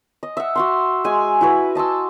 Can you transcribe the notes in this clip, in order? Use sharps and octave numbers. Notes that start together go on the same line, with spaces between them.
D#5
E5 F#5
F#4 F#5 C6
G#3 G#5
E4 F#4 B4
D#5 A5 C6 E6